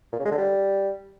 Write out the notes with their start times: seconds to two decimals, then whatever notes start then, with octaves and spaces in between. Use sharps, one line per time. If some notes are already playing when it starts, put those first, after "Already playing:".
0.13 A#2
0.19 C#3
0.25 G#3
0.32 D3
0.38 G3